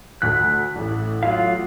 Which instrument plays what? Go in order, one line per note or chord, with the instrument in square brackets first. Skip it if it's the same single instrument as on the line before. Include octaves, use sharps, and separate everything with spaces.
[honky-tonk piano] D2 B6 [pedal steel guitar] F#6
[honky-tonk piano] A1 A2
[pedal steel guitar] F#3 F4 F5